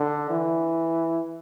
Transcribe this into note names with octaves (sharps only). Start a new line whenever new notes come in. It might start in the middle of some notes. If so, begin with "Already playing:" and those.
Already playing: D3
E3